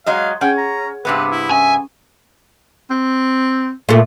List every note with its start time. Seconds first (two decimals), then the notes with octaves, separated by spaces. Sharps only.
0.06 F#3 G#3 D#5 F5
0.41 C#4 G#4 F#5 G5
0.58 A#5
1.05 G2 C3 B3 B4
1.31 E4
1.51 C#4 E5 G#5
2.90 C4
3.89 A#2 A3